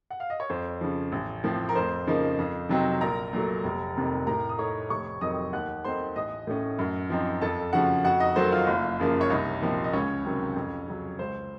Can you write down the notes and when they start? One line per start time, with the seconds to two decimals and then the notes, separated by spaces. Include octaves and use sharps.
0.10 F#5
0.20 F5
0.30 D#5
0.40 C#5
0.50 F2 C5
0.81 C#3 F3
1.12 A1
1.44 A2 F3 C4
1.69 A#4
1.75 F2 C5
2.07 C#3 F3 A#3 D#4
2.39 F2
2.69 C3 F#3 C4 D#4
3.01 A#1 A#4 A#5
3.33 A#2 F#3 A3
3.64 F1
3.96 F2 C3 D#3 A#3
4.27 A2 A#4 A#5
4.49 D#6
4.59 A3 D#4 C#5 C#6
4.89 F1 C#5 C#6
5.21 F2 D#3 F#3 C4 D#5 D#6
5.53 D#2 F#5 F#6
5.84 D#3 A3 C4 D#4 C5 C6
6.16 A1 D#5 D#6
6.47 A2 A3 C#4
6.79 F#2
7.10 F3 C4 D#4
7.41 F2 A4 A5
7.73 C#3 F3 A3 F#4 F#5
8.04 F2 F#4 F#5
8.20 D#4 D#5
8.36 D#3 F#3 A3 C5
8.52 F4 F5
8.67 F#1
8.99 F#2 C#3 F3 A#3
9.21 C#5
9.30 C2 D#4 D#5
9.62 A#2 F3 C4 D#4
9.84 D#5
9.93 C#2 C#4 C#5
10.25 C3 D#3 F#3 C4
10.56 F2
10.88 C#3 F#3
11.19 C#2 C5